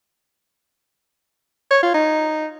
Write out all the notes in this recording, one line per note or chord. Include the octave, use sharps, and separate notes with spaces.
C#5
F4
D#4